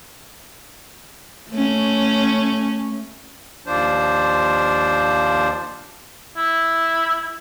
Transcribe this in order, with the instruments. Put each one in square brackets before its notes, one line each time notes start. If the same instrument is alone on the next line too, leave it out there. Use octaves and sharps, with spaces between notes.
[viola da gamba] A3 C#4
[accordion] D#2 F3 D4 C5
[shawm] E4